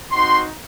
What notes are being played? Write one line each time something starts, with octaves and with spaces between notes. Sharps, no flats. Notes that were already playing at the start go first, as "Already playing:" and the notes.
C4 D#4 F#4 C6